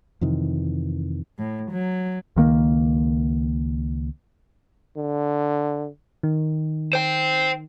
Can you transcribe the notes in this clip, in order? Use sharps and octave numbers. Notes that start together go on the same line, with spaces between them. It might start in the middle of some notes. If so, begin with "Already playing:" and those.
F2 C3 D#3 E3
A2
F#3
C#2 D#3 A#3
D3
D#3
C5 G5